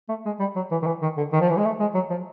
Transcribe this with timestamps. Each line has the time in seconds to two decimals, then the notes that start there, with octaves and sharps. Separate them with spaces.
0.09 A3
0.25 G#3
0.40 G3
0.56 F#3
0.71 E3
0.82 D#3
0.86 E3
1.02 D#3
1.17 D3
1.33 D#3
1.41 F3
1.49 E3
1.57 G#3
1.65 A3
1.80 G#3
1.94 F#3
2.10 F3